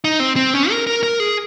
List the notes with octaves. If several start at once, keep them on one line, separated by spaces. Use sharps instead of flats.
D#4
C4
C4
C#4
A#4
A#4
A#4
G#4